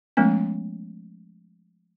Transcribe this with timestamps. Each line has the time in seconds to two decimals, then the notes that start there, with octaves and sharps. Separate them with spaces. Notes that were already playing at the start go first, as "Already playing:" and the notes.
0.17 F3 G#3 A3 B3 C#4